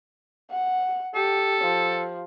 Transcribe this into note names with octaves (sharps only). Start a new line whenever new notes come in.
F#5
G4 A4
F3